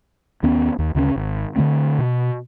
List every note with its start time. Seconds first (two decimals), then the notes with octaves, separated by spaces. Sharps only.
0.43 D#2 B3 C#4
0.79 D#2
0.95 D2 C#3 F3 C#4
1.16 G#1
1.56 D3 F#3 A3 C4
1.99 B2